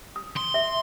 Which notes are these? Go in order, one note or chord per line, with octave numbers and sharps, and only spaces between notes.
D#6
C6
E5